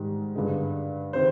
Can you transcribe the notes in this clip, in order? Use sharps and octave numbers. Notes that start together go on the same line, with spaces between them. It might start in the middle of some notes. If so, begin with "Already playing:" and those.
Already playing: G#2 D#3 G3
G2 D3 G#3
C3 D#3 C5